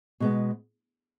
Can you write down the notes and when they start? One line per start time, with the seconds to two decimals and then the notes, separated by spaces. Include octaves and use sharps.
0.20 B2 G#3 B3